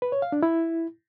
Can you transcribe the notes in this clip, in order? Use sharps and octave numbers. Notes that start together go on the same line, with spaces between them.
B4
C#5
F5
D4
E4